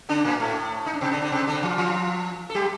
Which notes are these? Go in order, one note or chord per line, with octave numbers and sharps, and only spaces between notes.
D3 D4
A#2 A#3
A2 A3
D#4
D4
C3 C4
D3 D4
D3 D4
C3 C4
D3 D4
F3 F4
F3 F4
A4
G3 G4